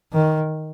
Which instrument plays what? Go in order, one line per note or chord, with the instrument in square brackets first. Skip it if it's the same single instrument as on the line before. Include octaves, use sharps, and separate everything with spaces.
[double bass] D#3